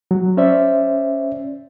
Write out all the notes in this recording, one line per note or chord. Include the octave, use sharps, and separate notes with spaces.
F#3
C#4 C5 D5 E5